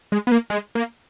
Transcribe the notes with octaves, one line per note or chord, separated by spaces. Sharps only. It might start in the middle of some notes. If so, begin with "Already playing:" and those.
G#3
B3
A#3
G#3
A#3